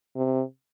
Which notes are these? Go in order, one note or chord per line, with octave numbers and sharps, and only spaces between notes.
C3